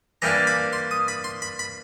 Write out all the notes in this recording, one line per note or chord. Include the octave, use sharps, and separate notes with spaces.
E3 G3 A#3 D4 A#5
B5
C6
D#6
B5
C6
B5
B5